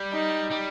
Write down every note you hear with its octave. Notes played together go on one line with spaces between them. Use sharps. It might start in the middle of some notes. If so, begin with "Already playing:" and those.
Already playing: G3
D#4
G3